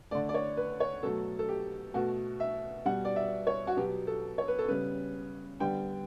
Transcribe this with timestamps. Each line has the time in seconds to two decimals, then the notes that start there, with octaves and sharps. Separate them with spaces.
0.11 D3 A3 D5
0.29 D5
0.34 C#5
0.57 B4
0.80 C#5
1.03 B2 F#3 A3 A4
1.39 A4
1.49 G4
1.94 B2 A3 F#4
2.40 E5
2.86 B2 G3 B3 F#5
3.05 D5
3.16 E5
3.47 C#5
3.67 F#4
3.77 B2 F#3 B3 G4
4.07 A4
4.38 C#5
4.48 B4
4.59 A4
4.68 C#3 G3 B3 B4
5.60 D3 G3 B3 G5